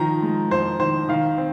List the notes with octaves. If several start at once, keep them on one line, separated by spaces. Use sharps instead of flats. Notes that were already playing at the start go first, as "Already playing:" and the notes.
Already playing: D#3 F3 A#5
G#3
F2 C5
D#3 C5
D#3 F5
C4